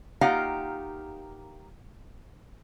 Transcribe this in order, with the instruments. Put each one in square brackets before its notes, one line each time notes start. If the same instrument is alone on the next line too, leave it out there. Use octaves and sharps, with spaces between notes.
[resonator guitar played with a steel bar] A#3 D#4 F4 G4 F5 F#5